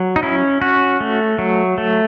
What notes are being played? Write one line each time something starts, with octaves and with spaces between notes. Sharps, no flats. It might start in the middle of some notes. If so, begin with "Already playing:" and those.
Already playing: F#3
D#4
C#4 E4
C#4 F#4
A3
F#3
A3